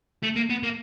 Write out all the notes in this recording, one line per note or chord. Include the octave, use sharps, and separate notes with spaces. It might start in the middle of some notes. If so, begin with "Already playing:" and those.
A3
A#3
B3
A#3